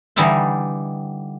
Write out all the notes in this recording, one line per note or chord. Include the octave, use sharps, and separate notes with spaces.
D3 E3 G3 D#4 E4 C6